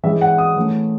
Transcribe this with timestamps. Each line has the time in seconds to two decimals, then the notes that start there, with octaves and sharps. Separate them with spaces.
0.03 E3 G#3 C#4 E5
0.21 F#5
0.38 D#6
0.57 E3 A3 C#4